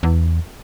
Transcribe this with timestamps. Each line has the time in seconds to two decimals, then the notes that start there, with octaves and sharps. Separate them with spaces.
0.03 E2